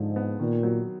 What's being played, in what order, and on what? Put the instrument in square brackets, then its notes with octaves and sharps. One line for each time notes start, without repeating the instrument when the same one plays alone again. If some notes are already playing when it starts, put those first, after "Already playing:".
Already playing: [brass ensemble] G#2 [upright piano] D3 F3
[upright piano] B3
[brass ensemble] A#2 [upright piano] D#3
[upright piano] F#3